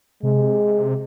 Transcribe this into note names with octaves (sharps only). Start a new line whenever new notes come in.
C3 G#3